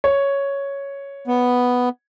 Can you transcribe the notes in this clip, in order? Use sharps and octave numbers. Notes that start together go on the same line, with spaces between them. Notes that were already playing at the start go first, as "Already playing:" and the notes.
C#5
B3